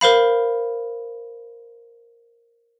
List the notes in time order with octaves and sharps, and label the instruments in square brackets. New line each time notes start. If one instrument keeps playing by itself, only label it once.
[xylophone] A#4 C5 F5 B5